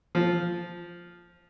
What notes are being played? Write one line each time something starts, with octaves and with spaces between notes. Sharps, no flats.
F3